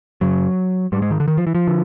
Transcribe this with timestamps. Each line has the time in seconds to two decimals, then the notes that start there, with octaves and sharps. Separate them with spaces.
0.21 F#2 C#3 F#3
0.92 G#2 G3
1.02 G#3
1.11 D#3
1.20 D3
1.28 D#3
1.37 F3
1.47 E3
1.55 F3
1.67 D3